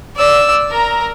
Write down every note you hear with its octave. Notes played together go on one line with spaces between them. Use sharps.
D5 E6
A#4 A#5